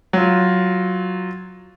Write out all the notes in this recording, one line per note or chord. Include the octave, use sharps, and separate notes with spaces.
F#3 F4